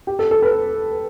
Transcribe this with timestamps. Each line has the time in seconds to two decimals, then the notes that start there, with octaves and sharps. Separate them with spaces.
0.07 G4
0.19 A4
0.31 A4
0.42 B4